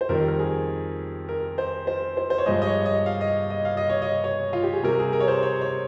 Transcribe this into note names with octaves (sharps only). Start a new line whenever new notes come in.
C5
F2 D#3 G3 A#4
A#4
G#4
A#4
C5
C5
C5
C5
C#5
G2 F3 G#3 D#5
D#5
C#5
D#5
F5
D#5
D#5
F5
D#5
C#5
D#5
C#5
F4
G4
G#4
C3 G3 A#4
G#4
A#4
C#5
C5
C#5
C#5